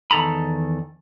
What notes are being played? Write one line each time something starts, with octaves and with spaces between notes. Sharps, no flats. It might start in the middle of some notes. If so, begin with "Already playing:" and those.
E2 D#3 A4 A#5 B5